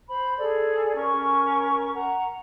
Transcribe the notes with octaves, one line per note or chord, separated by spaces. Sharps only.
C5 B5
G#4 A4 D5
C#4 A#4 C#6
F#5 A#5